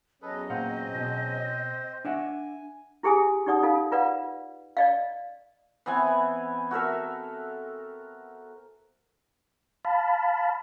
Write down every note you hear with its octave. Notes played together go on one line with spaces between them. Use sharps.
E2 F#3 C#4 G#4 A4 B4 D#5
A#2 C4 C5 F5 F#5
B2
D4 E5 F#5 G#5
E4 G4 G#4 G#5 D#6
D#4 G4 D5 F#5 D#6
D#4 F4 A4 F5
F4 B4 D5 F5 F#5
D5 D#5 F5
E3 B3 C4 G#5
F#4 A4 A#4 E5
F5 A5 B5